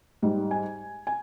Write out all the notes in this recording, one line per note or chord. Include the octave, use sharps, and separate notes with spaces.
G#2 G3
G#5
G#5